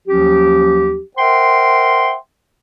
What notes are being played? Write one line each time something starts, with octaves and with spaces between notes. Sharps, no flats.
D#2 F3 F#3 C#4 G4
A#4 C5 E5 F#5 G5 C6